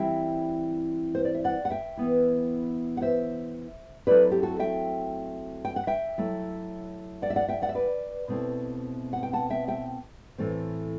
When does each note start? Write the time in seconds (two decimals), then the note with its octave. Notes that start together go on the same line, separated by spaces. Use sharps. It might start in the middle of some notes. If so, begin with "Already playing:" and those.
Already playing: E3 G3 C4 E4 E5 G5
1.15 C5
1.25 D5
1.35 E5
1.44 D5 F#5
1.65 F#5
1.70 E5 G5
1.97 E3 B3 E4
2.97 F#5
3.02 C5 E5
4.07 F#3 A3 C4 E4 B4 D5
4.31 G4
4.43 F#4 A4
4.59 E5 G5
5.65 G5
5.76 F#5
5.87 E5 G5
6.18 F#3 A3 E4
7.22 D5 F#5
7.30 E5
7.36 D5 F#5
7.49 E5 G5
7.62 D5 F#5
7.69 E5
7.75 B4 D5
8.28 B2 A3 C4 E4
9.13 F#5
9.23 G5
9.33 F#5 A5
9.50 E5 G5
9.68 E5 G5
10.38 A2 E3 A3 C4